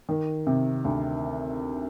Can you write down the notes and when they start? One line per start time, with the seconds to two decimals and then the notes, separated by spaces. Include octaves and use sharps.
0.09 D#3
0.47 C3
0.85 D2